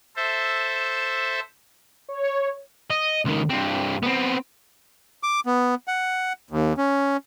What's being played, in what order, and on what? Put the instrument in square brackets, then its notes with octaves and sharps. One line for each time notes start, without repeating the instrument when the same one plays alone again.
[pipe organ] A4 C5 E5
[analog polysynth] C#5
[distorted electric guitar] D#5
C#2 D#3
G2 C4
B3 C4
[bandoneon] D6
B3
F#5
D#2
C#4